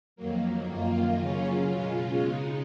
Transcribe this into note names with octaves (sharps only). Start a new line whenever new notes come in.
F2 D#3 F#3 A#3
F#2 D#3 A#3 F4
C#3 F#3 C#4 F4
B2 G#3 C#4 F4
C#3 G#3 D#4